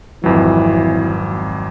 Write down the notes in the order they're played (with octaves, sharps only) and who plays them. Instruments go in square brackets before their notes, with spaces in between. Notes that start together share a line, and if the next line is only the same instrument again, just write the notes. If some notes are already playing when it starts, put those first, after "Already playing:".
[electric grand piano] G#1 F2 F#3 [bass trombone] E3